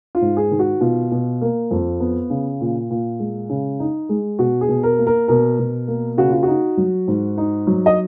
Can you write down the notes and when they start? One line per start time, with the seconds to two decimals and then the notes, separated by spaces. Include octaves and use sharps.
0.15 F4
0.21 G#2
0.37 G#4
0.51 D#3
0.59 F#4
0.81 B2 F4
1.11 B2
1.41 A#3
1.71 F2
2.00 B3
2.30 C#3
2.61 A#2
2.90 A#2
3.19 G#3
3.49 C#3
3.80 D#4
4.09 G#3
4.39 B2 F#4
4.61 G#4
4.68 B2
4.83 A#4
4.98 A#3
5.07 A#4
5.28 B2 A#4
5.59 B2
5.88 A#3
6.17 C#3 F#4
6.30 F4
6.43 D#4 F#4
6.77 F#3
7.08 G#2
7.38 D#4
7.67 F#3
7.86 D#5